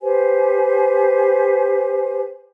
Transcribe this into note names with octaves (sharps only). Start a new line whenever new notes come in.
G4 B4 C5 G#5